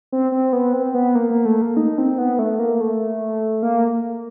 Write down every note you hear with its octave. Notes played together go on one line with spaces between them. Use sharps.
C4
C4
B3
C4
B3
A#3
A#3
A3
A#3
D#4
C4
B3
A3
A#3
A3
A#3